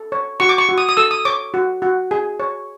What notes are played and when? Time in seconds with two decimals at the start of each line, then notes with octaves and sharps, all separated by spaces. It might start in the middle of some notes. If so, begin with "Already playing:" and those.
Already playing: A4
0.12 C#5
0.40 F#4 C#6
0.49 D6
0.58 C#6
0.69 F#4
0.78 D#6
0.89 D#6
0.97 A4 E6
1.11 D#6
1.25 C#5 D6
1.54 F#4
1.82 F#4
2.11 G#4
2.40 C#5